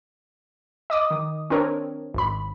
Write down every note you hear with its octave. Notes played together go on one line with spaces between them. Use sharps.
D#5 D6 D#6
D#3
C4 D4 A#4 C#5
G#1 B5